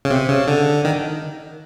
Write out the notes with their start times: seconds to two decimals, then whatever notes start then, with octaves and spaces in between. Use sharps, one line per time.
0.05 C#3
0.11 C3
0.29 C#3
0.48 D3
0.85 D#3